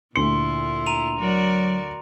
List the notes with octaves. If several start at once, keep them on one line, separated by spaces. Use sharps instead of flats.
D2 A#2 E4 F4 C6 C#7
A#5 D#7 F7
F#3 F#4 A#4 D5